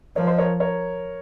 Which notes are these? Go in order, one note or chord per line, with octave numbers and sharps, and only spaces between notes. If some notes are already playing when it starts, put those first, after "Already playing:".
F3 A#4 C#5
C5 D#5
A#4 C#5
A#4 C#5